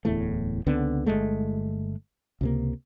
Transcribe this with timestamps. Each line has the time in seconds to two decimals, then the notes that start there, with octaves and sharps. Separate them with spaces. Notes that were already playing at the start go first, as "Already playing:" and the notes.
0.05 D1 E2 A2 A3
0.66 C#2 D3 B3 C4
1.06 G1 G2 G#3 A3
2.41 C#2 C3 A#3